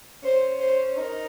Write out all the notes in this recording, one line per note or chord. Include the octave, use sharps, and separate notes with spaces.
C#4 C5
C5
D#4 A#4